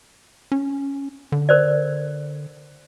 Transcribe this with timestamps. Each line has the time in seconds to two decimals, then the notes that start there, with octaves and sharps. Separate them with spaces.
0.52 C#4
1.32 D3
1.49 A#4 C5 D5